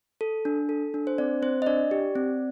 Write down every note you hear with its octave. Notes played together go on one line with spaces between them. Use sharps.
A4
D4
A4
D4
C5
C4 D5
C4 C5
D#5
D4 D5
G4
C4